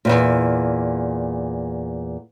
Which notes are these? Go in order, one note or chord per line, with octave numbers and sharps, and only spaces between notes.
E2 G2 A#2